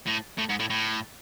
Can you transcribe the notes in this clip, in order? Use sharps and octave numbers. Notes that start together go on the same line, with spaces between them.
A2
A2
G#2
A2
A2